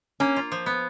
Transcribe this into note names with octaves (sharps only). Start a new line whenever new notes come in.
A#3 C#4
F4
F3
B3